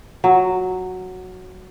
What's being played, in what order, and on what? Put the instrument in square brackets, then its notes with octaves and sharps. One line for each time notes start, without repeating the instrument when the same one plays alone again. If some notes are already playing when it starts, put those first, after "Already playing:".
[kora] F#3